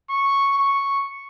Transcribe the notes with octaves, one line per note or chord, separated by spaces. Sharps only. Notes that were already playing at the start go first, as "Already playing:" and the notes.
C#6
C#6